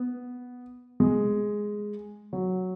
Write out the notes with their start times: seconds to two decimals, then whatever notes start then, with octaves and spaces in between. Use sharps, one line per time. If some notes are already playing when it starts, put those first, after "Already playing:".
Already playing: B3
1.00 G#3
2.33 F#3